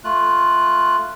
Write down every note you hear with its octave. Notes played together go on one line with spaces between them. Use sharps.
A3 F4 F#6